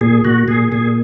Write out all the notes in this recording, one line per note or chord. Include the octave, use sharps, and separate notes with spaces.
A#2 G#4
A#2 F#4
A#2 G#4
A#2 G#4